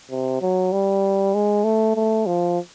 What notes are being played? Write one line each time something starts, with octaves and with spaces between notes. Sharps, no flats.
C3
F#3
G3
G#3
A3
A3
F3